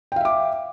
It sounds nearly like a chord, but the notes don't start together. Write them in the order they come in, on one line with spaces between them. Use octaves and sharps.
G5 F5 E5 D6